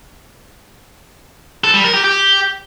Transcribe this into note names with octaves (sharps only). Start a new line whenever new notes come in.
A4
G3
A#4
G4
G4